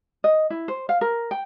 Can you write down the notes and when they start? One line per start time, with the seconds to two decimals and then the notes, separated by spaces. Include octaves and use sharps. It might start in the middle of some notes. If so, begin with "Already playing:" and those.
0.24 D#5
0.50 E4
0.68 C5
0.89 F5
1.01 A#4
1.31 G5